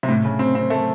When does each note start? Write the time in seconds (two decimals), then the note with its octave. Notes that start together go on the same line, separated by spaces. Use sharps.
0.03 C3
0.08 A2
0.25 C#3
0.39 C4
0.55 C4
0.70 A3